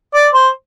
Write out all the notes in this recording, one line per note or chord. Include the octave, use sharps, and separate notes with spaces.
D5
C5